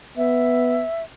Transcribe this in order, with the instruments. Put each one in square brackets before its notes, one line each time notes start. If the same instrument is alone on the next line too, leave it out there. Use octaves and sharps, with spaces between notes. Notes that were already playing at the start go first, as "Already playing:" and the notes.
[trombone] B3 [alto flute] E5